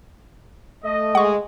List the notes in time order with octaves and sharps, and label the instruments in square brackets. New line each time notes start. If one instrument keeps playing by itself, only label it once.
[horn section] A3 D#5
[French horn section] G#3 [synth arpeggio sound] F#5 C#6